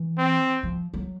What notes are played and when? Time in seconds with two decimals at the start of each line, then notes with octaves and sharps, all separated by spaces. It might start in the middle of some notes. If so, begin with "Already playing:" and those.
Already playing: E3
0.18 C4
0.63 F3
0.94 F#3